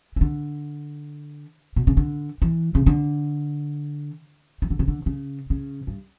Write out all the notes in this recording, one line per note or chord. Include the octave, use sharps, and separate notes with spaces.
E3
D3
B2
C#3
D3
E3
C#3
D3
E3
D3
C#3
D3
C#3
C#3
G2